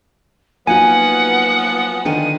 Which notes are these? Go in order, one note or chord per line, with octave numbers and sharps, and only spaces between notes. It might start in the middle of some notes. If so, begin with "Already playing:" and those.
F3 F#3 A#3 B3 D#4 F#4 F#5 G#5
D3 D#3 G5 D#7